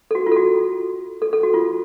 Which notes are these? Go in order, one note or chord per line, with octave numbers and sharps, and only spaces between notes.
A4
F#4
F4
A4
F#4
A4
A4
F#4
F4